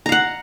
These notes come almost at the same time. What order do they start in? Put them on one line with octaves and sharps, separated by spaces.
A#5 F5 F#5